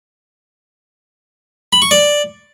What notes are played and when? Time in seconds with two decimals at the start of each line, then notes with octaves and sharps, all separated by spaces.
1.73 B5
1.82 C#6
1.91 D5